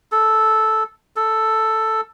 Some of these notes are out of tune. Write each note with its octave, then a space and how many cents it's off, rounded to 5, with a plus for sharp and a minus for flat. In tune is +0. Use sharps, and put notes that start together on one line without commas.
A4 -5
A4 +5